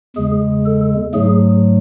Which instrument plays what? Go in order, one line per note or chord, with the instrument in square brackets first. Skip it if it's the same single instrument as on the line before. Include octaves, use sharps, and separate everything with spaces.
[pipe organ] E2 C#3 G#3 G#4
A4
G#2 F#3 A3 G#4